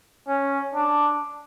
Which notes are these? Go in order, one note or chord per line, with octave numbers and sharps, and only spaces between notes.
C#4
D4